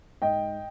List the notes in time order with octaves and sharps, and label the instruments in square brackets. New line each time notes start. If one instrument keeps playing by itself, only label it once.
[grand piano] G#2 D#5 G5